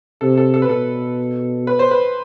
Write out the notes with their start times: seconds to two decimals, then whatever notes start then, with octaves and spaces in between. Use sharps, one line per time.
0.21 C3 A4
0.37 A4
0.54 A4
0.62 B4
0.69 B2 A4
1.67 B4
1.79 C5
1.91 B4